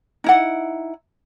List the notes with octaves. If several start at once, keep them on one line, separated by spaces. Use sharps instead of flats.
D#4 E4 F#5